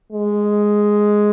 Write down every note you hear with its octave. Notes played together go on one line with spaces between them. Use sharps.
G#3